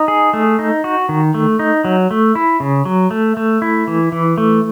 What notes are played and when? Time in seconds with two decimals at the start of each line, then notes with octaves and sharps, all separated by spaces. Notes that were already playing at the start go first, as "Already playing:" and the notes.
Already playing: D#4
0.08 G#4
0.33 A3
0.59 D#4
0.84 F#4
1.09 D#3
1.34 A3
1.59 D#4
1.85 F#3
2.11 A3
2.35 E4
2.60 C#3
2.85 F#3
3.11 A3
3.37 A3
3.62 E4
3.87 E3
4.12 E3
4.38 A3